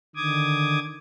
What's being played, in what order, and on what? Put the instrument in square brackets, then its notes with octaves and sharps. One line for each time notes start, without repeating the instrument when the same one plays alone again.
[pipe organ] D3 D#3 D6 D#6 G#6